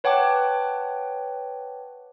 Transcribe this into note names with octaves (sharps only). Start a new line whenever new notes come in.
B4 C#5 F#5 G5 A5 D6